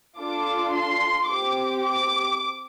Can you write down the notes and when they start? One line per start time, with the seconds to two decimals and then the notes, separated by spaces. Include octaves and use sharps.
0.18 D4 F4 A4 D6
0.73 C6
1.28 C4 G4 D6
1.84 D6